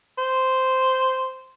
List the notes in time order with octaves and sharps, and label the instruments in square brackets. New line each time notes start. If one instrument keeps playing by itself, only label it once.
[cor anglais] C5